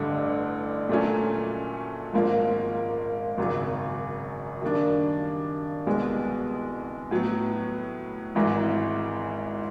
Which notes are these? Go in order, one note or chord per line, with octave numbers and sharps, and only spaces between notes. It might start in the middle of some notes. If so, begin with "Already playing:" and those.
Already playing: A1 G2 D3
A#2 F#3 A3 C#4
G#1 G#2 F3 A#3
G#1 F#2 C#3 F#3
F#2 D#3 G3 A#3 D4
C2 B2 G#3 B3
A2 F#3 B3
G#1 G#2 E3